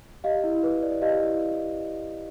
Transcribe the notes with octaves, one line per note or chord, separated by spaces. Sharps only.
G4 D#5 F5
E4
B4
D5
G4 D#5 F5
E4